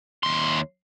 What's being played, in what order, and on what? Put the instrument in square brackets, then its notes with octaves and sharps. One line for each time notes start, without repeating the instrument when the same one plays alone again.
[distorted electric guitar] D#2 C6